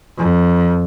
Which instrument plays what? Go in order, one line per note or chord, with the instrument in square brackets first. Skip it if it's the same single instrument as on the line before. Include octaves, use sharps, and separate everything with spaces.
[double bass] F2